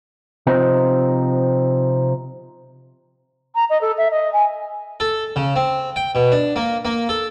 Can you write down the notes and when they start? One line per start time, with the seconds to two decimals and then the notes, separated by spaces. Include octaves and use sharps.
0.47 C3 F3 C4 D#4
3.55 A#5
3.69 D#5
3.81 A4
3.97 E5
4.10 D#5
4.33 G#5
5.00 A4
5.36 C#3
5.56 C4
5.96 G5
6.15 B2
6.32 D4
6.56 A#3
6.85 A#3
7.09 A4